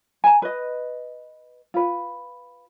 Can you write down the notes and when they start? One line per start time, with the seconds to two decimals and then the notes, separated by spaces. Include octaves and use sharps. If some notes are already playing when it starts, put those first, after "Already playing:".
0.24 G#5 A#5
0.42 B4 D#5
1.74 F4 B4